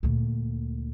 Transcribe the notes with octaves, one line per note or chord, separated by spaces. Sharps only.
D2 A#2